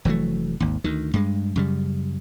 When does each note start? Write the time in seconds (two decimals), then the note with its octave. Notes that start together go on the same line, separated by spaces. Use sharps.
0.05 F1 E3 F#3 A3
0.60 G#1 D#2
0.84 D2 D#3
1.14 G2 G#3
1.56 F#2 C#3 G3